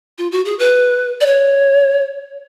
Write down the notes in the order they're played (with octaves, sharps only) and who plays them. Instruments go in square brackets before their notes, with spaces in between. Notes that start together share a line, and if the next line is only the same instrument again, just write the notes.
[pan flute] F4
F#4
G#4
B4
D5
C#5